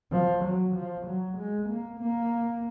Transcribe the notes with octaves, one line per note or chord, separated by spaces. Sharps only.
F3
F#3
F3
F#3
G#3
A#3
A#3